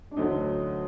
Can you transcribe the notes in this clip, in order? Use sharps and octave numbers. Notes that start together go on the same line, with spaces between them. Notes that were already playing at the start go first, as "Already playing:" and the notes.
D4
D2 D3 F#3 D#4